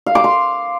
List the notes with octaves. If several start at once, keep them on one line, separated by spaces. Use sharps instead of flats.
F5
D6
C6